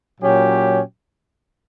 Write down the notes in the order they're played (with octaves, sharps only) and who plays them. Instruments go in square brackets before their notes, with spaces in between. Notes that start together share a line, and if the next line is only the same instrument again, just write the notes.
[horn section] A#2 F#3 C#4 G4